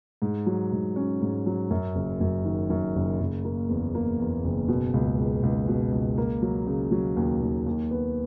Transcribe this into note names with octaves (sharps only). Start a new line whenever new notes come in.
G#2
F#3
G#2
C#4
G#2
F#3
F#2
F#1
F#2
D#3
F#2
F#1
F#1
A#3
E2
A#3
E2
F#1
B2
C#2
C#2
C#2
B2
C#2
A#3
F#3
C#3
F#3
D#2
D#2
D#2
B3